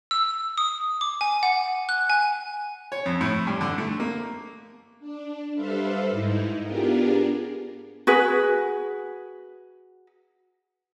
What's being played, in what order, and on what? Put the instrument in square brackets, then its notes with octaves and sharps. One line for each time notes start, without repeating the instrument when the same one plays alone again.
[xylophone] E6
D#6
D6
G#5
F#5
F#6
G#5
[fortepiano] C#5
F2
A2
G2
D3
A3
A#3
[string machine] D4
G3 A4 B4 C5 E5 F5
G#2 D#4 E4
B3 D4 F4 G4 G#4 A#4
[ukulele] F#4 G#4 B4